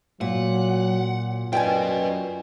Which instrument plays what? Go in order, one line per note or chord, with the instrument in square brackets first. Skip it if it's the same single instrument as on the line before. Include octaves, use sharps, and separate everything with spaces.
[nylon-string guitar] A#2 [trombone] F#3 [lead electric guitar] F#5
[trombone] F#2 [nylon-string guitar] F4 D5 [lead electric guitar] B4 D#5 [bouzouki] G5 G#5